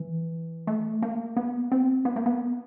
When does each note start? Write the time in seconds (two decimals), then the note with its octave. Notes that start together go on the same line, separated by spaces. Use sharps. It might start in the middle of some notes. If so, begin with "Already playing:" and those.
Already playing: E3
0.67 A3
1.02 A#3
1.37 B3
1.72 C4
2.05 B3
2.16 A#3
2.26 B3